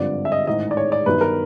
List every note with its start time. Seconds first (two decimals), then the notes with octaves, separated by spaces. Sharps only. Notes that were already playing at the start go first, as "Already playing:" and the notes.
Already playing: G#1 G2 D3 F3 D5
0.25 E5
0.32 D#5
0.47 A1 G#2 D#3 D#5
0.71 D5
0.77 C#5
0.92 D5
1.06 G1 G2 D#3 F#3 B4
1.21 A#4